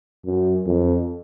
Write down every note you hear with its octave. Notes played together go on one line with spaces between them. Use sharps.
F#2
F2